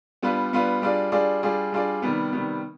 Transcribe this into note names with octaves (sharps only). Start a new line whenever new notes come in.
G3 B3 D4 F4 B4
G3 B3 D4 F4 B4
G3 D4 F4 G#4 D5
G3 D4 F4 G#4 D5
G3 D4 F4 G#4 D5
G3 D4 F4 G#4 D5
C3 D#3 G3 B3
C3 D#3 G3 B3